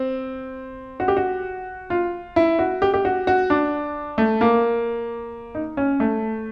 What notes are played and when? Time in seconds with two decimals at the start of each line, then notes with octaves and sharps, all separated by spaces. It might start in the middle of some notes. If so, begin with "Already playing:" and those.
Already playing: C4
1.00 F#4
1.08 G4
1.17 F#4
1.90 F4
2.36 E4
2.59 F#4
2.82 G4
2.94 G4
3.05 F#4
3.27 F#4
3.50 D4
4.18 A3
4.41 A#3
5.55 D#4
5.77 C#4
6.00 A3